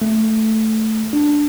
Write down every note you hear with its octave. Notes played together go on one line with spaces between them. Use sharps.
A3
D4